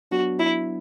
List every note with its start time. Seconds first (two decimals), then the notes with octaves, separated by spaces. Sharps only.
0.11 F#3 B3 D4 F#4
0.39 E4